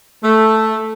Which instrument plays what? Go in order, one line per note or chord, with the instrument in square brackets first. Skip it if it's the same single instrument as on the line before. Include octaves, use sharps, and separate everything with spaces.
[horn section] A3